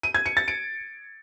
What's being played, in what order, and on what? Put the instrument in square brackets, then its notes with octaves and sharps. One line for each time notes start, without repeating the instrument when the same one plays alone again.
[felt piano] D#7
G#6
C#7
A6
D7